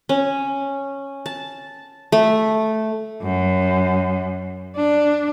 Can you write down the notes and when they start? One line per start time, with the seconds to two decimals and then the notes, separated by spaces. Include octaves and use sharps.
0.09 C#4
1.26 A5
2.12 A3
3.22 F#2
4.76 D4